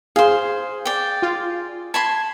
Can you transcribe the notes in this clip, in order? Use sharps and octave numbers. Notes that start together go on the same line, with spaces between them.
G#4 C5 F5
D5 G5
F4
A5 B5 C6 G#6